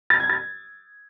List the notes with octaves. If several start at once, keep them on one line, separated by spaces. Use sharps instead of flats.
A6
G#6
A6